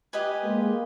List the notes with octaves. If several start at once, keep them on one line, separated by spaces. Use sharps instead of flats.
G4 B4 D#5 G#5
G#3 A#3